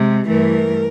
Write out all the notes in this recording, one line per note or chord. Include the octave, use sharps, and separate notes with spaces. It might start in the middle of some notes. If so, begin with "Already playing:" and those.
Already playing: C3 G#3
G2 E3 A3 A#4